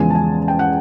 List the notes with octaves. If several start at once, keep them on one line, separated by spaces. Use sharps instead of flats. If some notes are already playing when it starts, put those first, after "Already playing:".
Already playing: E2 C#3 F3 G#3 B3 G#5
A5
G#5
G5
F#5